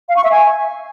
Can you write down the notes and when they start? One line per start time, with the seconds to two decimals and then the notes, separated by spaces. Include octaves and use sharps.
0.09 F5
0.16 C#6
0.24 E5
0.31 G#5